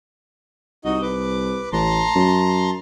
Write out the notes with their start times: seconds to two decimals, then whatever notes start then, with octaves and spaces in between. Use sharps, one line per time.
0.85 C2 D#4 F#4 D#5
1.02 B4 D6
1.73 A1 A5 A#5 C6
2.15 F#2